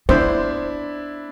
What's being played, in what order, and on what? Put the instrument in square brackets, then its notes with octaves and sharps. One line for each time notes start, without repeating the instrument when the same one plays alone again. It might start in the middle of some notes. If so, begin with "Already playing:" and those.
[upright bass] B3 [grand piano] D4 E4 [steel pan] C5